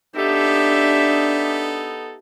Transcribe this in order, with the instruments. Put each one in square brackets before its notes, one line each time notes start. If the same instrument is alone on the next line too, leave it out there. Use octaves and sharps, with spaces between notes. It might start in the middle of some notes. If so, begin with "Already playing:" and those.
[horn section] B3 D#4 A4 [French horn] D4 [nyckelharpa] G4 E5